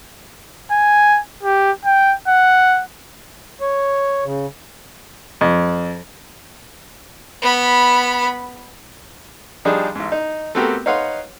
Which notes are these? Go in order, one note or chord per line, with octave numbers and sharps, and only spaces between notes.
G#5
G4
G5
F#5
C#5
C#3
F2
B3 B5
F3 G3 D4 D#4 G#4
A1 G#2
D#4
A3 B3 C4 F#4 G4 A#4
D#4 B4 C#5 F5 F#5 C6